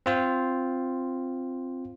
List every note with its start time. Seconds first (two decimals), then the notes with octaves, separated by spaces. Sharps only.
0.06 C4 F4 C5